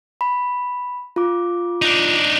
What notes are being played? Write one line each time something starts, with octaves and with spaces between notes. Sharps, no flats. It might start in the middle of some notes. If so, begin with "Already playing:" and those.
B5
F4 D6
D4 D#4